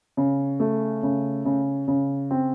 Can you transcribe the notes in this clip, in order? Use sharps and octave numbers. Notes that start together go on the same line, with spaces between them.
C#3
A3
C#3
C#3
C#3
C4